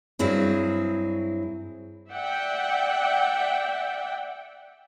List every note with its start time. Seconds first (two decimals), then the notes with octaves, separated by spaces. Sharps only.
0.19 G2 F#3 C4 E4 G#4
2.11 D5 E5 F#5 G5